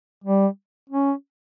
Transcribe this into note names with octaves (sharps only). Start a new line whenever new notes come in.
G3
C#4